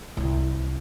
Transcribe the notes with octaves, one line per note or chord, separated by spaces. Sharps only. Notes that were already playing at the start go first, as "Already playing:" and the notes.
C2 F4